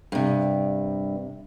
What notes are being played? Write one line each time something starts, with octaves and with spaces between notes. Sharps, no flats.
G2 C3